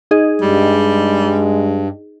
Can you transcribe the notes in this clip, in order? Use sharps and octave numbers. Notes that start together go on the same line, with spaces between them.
D#4 G#4 D#5
G2 G3 G#3